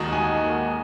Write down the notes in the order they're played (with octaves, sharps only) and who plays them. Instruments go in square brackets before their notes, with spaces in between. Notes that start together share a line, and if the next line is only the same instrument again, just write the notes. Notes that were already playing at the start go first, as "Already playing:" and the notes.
Already playing: [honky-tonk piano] D#2 D#3 G#3 F#4 [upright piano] A#5 D#6
[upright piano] G#5